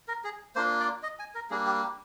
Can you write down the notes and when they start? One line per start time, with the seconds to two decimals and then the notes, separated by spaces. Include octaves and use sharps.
0.08 A#4
0.24 G#4
0.56 A#3 D4 F4 C5
0.80 D5
1.03 D#5
1.19 G#5
1.35 A#4
1.50 G3 A#3 D4 G#4
1.66 G4
1.83 G4